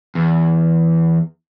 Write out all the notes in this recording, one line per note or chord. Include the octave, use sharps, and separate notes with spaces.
E2